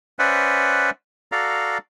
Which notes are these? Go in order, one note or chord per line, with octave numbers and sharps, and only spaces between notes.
C#4 B4 C5 D5 E5 F#5
F#4 A4 D5 F5 A#5